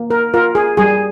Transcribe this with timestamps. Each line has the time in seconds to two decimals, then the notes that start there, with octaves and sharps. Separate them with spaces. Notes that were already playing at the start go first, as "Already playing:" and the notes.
Already playing: A#3
0.10 A#4
0.34 F4 A#4
0.55 G#4
0.77 G3 G#4